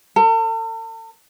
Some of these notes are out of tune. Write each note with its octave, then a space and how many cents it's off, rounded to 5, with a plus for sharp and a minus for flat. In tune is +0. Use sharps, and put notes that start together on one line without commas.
A4 +45